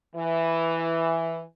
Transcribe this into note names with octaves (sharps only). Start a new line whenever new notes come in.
E3